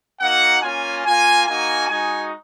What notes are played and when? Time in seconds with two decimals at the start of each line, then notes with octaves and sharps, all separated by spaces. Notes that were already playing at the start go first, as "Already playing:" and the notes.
0.20 A#3 D#4 F#4 F#5
0.62 A#3 C#4 F4 G#5
1.04 A#3 F4 G#5
1.46 A#3 D#4 F#4 G#5
1.89 G#3 D#4 F#4 G#5